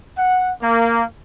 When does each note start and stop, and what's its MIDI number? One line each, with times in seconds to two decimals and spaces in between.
0.17 0.50 78
0.61 1.03 58